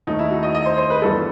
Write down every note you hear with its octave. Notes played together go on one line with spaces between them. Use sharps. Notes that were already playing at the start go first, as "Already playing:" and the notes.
D#2 D#3 A3 D#4
E4
F#4
D#5
D#5
C5
C5
B4
G1 G2 E3 G3 A4